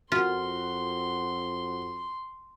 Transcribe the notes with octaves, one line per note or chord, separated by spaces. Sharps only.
F2 F4 F#4 A#4 C6